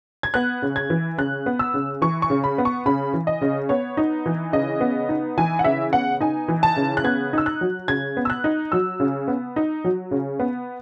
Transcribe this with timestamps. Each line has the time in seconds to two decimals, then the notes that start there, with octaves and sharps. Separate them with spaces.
0.23 G#6
0.34 B3 F#6
0.62 C#3
0.76 G#6
0.90 E3
1.18 C#3 F#6
1.46 B3
1.59 E6
1.74 C#3
2.02 E3 C#6
2.22 C#6
2.30 C#3
2.44 B5
2.58 B3
2.65 C#6
2.86 C#3 B5
3.14 E3
3.27 D#5
3.42 C#3
3.69 B3 C#5
3.97 D#4
4.26 E3
4.53 C#3 D#5
4.81 B3
5.09 D#4
5.38 E3 G#5
5.59 F#5
5.64 C#3 E5
5.93 B3 F#5
6.21 D#4 G#5
6.48 E3
6.63 A5
6.77 C#3
6.97 F#6
7.04 B3 G#6
7.33 D#4 E6
7.46 F#6
7.61 F#3
7.88 C#3 G#6
8.17 B3
8.25 E6
8.30 F#6
8.44 D#4
8.72 F#3 E6
9.00 C#3
9.28 B3
9.56 D#4
9.84 F#3
10.11 C#3
10.40 B3